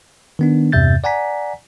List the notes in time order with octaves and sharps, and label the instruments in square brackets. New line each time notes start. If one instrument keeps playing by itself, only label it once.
[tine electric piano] D#3 B3 D4
E2 G2 C3 E5 G6 A6
D5 F#5 G#5 A#5 B6